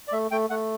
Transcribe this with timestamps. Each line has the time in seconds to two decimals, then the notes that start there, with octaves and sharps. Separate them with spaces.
0.08 D5
0.12 A3 E5
0.31 A3 G5
0.50 A3 F#5